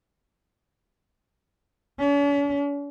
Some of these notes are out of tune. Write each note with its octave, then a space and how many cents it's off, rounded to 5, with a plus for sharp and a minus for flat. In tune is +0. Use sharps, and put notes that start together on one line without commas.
C#4 +45